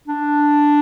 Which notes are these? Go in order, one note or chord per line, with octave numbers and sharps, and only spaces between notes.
D4